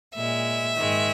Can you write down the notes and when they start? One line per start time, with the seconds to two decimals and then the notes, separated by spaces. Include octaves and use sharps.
0.15 A#2 G#3 E5
0.75 G#2 D#3 G#3